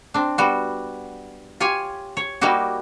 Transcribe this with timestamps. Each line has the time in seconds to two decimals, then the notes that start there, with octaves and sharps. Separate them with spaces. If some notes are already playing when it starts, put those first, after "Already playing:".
0.14 C4 D4
0.38 G3 B3 F#4
1.60 F4 G4 C#5 G#5
2.17 C#5
2.41 G3 A#3 D#4 E4 F#4 G4